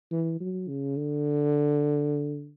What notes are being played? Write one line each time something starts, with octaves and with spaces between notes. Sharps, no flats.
E3
F#3
C#3
D3